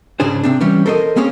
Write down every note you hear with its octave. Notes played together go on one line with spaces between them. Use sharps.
C#2 G#2 C#3 D4 G#4 C5
C3 C4 D4
E3 G3 C#4 G4
A4 A#4 C5 C#5 D#5
A#3 C4 C#4 G#4 C#5